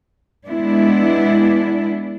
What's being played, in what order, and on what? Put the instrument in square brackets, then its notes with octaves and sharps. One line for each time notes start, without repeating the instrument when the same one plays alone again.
[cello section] G#3 B3 D4 E4